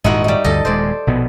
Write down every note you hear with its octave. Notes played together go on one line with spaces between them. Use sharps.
D#1 G#2 D#4 E4 F#4
G3 D#4
D2 G2 D3 A4 D#5
D#1 G#3 C5 D5
A#1 B2 B3